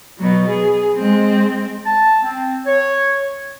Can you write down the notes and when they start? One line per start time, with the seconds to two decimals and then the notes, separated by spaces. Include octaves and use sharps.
0.18 B2 F#3
0.48 G#4
0.96 G#3 C4
1.86 A5
2.24 C4
2.66 C#5